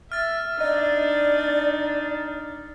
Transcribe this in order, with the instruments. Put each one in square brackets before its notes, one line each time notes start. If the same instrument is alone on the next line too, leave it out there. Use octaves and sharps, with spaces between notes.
[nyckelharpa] E5 [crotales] F6 A6
[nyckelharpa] D4 D#4 [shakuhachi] D5 [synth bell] D#5